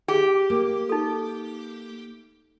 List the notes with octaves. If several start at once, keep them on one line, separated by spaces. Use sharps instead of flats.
G4 G#4
A#3
D#4 A4